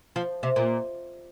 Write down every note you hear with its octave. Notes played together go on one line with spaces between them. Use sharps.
F3
C3
A#2